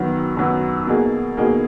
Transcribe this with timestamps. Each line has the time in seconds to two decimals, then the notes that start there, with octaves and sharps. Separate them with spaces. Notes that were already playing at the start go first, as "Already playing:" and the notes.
Already playing: F#2 D#3 F#3 B3
0.37 F#2 D#3 F#3 B3
0.87 B2 A#3 D#4 G#4
1.37 B2 A#3 D#4 G#4